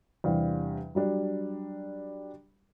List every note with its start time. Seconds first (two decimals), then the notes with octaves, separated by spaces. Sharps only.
0.24 E2 C3 G3 D4 F5
0.95 F#3 G3 D4